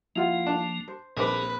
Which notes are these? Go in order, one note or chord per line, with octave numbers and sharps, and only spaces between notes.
F3 A#3 E4 F4 F#5
D4
C5
A#1 A#3 C4 G#4 B4 D6